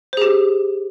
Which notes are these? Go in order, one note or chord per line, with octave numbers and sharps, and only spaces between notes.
G4 G#4 C5